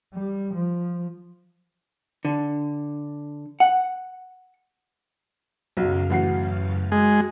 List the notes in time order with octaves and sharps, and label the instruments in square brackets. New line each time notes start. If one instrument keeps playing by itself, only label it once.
[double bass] G3
F3
[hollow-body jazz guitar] D3
F#5
[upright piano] B1 F#3 [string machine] F#2 C#3 F5
[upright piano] A1 F#4 C7
[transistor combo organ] G#3 [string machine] F#4